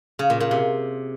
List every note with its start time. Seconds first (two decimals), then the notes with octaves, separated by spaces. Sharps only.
0.19 C#3
0.30 A#2
0.40 A#2
0.51 C3